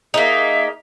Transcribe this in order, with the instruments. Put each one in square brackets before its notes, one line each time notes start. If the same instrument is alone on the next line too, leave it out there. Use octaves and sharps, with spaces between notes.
[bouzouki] A#3 D#4 [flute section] G#4 E5